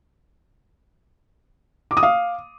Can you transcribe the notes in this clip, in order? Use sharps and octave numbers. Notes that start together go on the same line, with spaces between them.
D6
D#6
F5